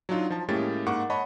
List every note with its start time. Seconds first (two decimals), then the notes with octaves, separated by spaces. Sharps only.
0.09 F#3 D4 D#4 F4
0.30 F3 A5
0.49 A2 G#3 A#3 C#4 G4 A6
0.86 G#2 A#3 F#5 C#6 D6
1.10 C#5 D#5 F#5 A5 B5 C#6